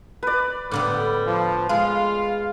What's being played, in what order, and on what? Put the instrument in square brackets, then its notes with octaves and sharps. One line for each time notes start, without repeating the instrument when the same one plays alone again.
[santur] B4 D5
[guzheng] A2 D3 B3 [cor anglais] G3
[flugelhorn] F3
[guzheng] G#3 [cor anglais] F4 [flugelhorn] F5